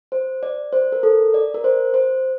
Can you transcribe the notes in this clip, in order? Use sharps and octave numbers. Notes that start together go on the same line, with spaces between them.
C5
D5
C5
A#4
A4
D5
A#4
C5
C5